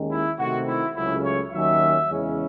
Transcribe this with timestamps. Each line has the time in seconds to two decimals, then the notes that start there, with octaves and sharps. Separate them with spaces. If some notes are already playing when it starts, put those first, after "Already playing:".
Already playing: D#2 D#3 G#3 C#4
0.11 E4
0.39 C3 D#3 A3 C4 F#4
0.68 E4
0.96 C#2 C#3 F#3 A3 C#4 E4
1.24 C#5
1.53 D#2 D#3 F#3 C#4 E5
2.10 E2 C#3 G#3 C#4